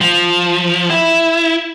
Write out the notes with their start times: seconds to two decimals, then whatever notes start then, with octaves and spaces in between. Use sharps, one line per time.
0.01 F3
0.90 E4